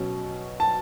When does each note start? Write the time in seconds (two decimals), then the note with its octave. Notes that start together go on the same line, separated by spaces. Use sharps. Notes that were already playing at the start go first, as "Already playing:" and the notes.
Already playing: B2 F#3 C#4
0.60 A5